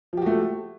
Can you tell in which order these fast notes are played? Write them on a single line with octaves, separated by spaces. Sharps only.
F3 G4 F#4 A3